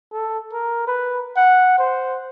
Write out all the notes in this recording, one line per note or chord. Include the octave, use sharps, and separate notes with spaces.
A4
A#4
B4
F#5
C5